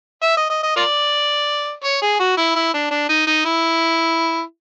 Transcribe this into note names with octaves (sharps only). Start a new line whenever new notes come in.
E5
D#5
D#5
D#5
F4 A#4 D5
C#5
G#4
F#4
E4
E4
D4
D4
D#4
D#4
E4